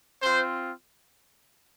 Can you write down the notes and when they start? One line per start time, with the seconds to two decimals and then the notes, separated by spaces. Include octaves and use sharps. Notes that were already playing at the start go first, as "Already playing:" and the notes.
0.23 C4 F4 C5